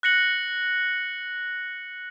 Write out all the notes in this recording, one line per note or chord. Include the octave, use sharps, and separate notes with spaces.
F#6 A#6 C#7 F#7